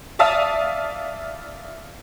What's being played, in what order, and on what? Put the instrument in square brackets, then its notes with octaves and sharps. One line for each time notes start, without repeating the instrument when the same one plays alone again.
[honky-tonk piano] D5 E5 F5 A5 D#6